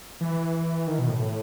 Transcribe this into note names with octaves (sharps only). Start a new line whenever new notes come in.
E3
D#3
B2
A2